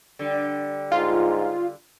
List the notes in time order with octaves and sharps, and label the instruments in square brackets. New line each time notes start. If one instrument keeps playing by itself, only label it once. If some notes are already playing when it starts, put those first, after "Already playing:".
[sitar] D3 G3
[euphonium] G#2 [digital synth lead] F4